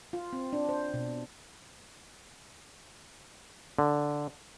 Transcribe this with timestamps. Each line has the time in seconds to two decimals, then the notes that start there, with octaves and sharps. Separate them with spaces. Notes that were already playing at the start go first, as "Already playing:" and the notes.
0.13 F4
0.33 C4
0.53 D4
0.69 C5
0.94 B2
3.79 D3